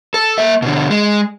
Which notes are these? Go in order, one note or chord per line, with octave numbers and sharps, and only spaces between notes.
A4
A#3 E5
B2 D3
G#3